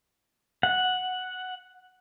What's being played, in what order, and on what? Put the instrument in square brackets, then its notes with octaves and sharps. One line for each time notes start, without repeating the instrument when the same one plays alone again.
[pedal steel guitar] F#5